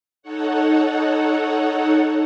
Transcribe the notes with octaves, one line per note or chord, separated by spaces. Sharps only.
D#4 A4 C#5 F#5